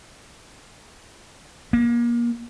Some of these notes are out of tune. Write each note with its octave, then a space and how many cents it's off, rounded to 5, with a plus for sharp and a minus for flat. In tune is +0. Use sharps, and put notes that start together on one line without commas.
A#3 +30